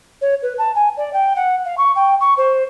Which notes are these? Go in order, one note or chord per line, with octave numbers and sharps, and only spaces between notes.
C#5
B4
A5
G#5
D5
G5
F#5
F5
C#6
G5
C#6
C5